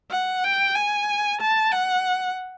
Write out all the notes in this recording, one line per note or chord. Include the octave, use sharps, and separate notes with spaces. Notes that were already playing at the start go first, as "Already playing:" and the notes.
F#5
G5
G#5
A5
F#5